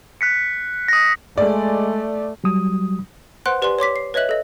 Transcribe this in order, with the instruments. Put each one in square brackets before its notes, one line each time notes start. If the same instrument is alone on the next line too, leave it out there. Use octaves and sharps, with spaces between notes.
[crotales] F#6 B6 C#7
D#6 A#6
[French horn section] G#3 [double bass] A3 [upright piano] D5
[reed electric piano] F#3 G3 D#6
[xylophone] B4 C5 F#5 C6 F#6 D7
G4 B4 D5 G#5 C6
C#5 C6 D6 B6
C7
B4 C#5 D#5 E5 F#6 F#7
A4 D#5